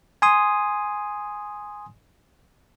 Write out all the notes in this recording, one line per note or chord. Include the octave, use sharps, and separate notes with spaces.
G#5 C6 D#6